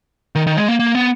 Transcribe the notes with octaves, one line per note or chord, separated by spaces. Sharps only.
D#3
D#3
G#3
A#3
A#3
B3